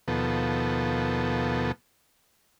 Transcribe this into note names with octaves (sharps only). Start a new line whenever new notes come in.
D#2 B2 F3 B3 A4